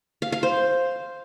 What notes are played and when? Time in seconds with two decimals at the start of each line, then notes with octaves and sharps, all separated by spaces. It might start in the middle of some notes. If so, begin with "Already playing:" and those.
0.22 F5
0.32 F5
0.43 C5